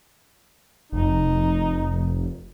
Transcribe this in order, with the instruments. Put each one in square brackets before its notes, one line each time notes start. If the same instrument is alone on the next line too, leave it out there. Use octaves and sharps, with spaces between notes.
[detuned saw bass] F1 [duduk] D#4